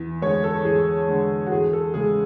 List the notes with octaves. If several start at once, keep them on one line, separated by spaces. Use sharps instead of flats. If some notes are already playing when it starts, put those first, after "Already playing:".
Already playing: E2
D3 G#3 C#5
A4
E2 G#4
D3 G#3
F#4
E2 G#4
A4
C#3 G#3 G#4